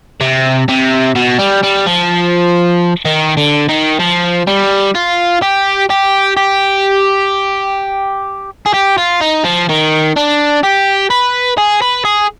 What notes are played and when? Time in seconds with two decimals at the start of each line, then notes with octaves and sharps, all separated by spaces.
0.21 C3
0.68 C3
1.16 B2
1.39 G3
1.64 G3
1.87 F3
3.05 D#3
3.37 D3
3.69 D#3
4.00 F3
4.47 G3
4.95 F4
5.42 G4
5.90 G4
6.37 G4
8.66 G#4
8.74 G4
8.98 F4
9.21 D#4
9.44 F3
9.69 D#3
10.16 D4
10.64 G4
11.10 B4
11.58 G#4
11.82 B4
12.05 G#4